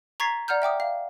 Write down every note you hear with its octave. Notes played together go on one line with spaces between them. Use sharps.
A#5 C#6 G#6 A6 B6 C7
D5 F#5 A#5 F6 G6
E5 G5 D6 D#6
F5